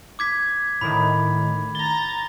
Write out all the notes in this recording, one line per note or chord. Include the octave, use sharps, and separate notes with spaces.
D6 G#6 B6
A2 D#3 B5
A#5 A6 G7